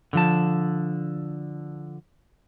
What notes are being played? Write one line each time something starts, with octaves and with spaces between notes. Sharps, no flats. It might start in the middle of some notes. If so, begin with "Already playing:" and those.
D3 F3 A5